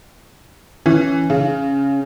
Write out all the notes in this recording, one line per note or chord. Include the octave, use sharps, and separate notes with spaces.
E3 C#4
C#3